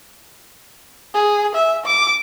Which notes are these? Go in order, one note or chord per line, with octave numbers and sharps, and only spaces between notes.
G#4
E5
D6